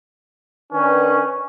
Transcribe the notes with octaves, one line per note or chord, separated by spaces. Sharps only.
D#3 C#4 D4 B4